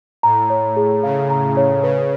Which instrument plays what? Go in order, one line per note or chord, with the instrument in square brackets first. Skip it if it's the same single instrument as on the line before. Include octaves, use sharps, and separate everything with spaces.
[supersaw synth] A2 [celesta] A#5
[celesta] C#5
G#4
[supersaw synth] C#3 [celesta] F5
[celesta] A#5
C#5
[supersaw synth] C#3 [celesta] B4